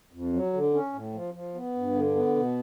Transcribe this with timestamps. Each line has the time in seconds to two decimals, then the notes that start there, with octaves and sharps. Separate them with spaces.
0.13 F2
0.33 F#3
0.53 D3
0.74 C#4
0.93 A2
1.14 F3
1.34 F3
1.55 B3
1.75 G2
1.95 D3
2.15 B3
2.36 B2